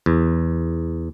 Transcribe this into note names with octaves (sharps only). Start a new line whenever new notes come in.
E2